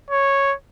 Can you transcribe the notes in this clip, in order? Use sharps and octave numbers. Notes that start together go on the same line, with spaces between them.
C#5